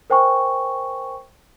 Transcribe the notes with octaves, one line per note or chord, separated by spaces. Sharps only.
A#4 C5 G5 G#5 C#6